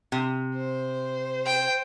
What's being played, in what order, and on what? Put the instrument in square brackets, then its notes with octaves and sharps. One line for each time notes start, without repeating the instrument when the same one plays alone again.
[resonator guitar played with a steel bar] C3
[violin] C5
[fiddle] G5